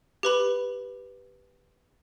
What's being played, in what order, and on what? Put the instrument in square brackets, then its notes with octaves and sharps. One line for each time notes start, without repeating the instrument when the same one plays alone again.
[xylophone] G4 B4 B5